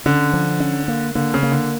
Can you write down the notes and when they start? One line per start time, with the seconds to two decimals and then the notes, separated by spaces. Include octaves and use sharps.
0.06 D3 C#4
0.33 F3
0.60 C#4
0.88 A#3
1.15 D3 A#3
1.34 C#3
1.43 A#3
1.52 D3